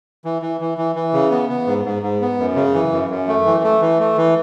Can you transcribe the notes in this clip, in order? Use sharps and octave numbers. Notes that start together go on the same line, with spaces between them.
E3
E3
E3
E3
E3
C#3
B3
B3
G#2
G#2
G#2
B3
F#2
C#3
E3
F#2
F#2
A3
E3
A3
E3
A3
E3